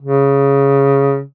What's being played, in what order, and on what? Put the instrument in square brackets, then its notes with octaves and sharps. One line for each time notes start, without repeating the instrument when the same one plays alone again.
[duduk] C#3